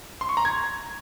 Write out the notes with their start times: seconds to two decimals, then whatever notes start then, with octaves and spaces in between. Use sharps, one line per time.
0.21 C6
0.29 C#6
0.37 A#5
0.45 G#6